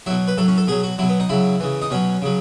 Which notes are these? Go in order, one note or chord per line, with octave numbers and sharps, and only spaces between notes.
B2 F#3 E4
B4
A2 F#3 A4
C#4
A4
B2 F#3 G#4
F#4
B2 F#3 E4
B3
D#4
C#3 F#3 E4
C#3 E3
D#4
B2 F#3 C#4
C#3 F#3